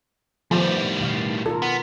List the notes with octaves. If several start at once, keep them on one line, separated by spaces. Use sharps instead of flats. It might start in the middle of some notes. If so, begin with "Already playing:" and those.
A2 D#3 F3 G3 B3
B2 D#3 F5
F4 A4 A#4
B3